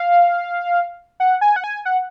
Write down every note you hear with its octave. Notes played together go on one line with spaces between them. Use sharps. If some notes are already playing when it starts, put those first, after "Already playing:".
Already playing: F5
F#5
G#5
F#5
G#5
F#5